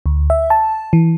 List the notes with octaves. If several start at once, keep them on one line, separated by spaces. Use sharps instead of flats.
D2
E5
A5
E3